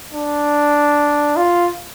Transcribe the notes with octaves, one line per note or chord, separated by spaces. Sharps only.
D4
F4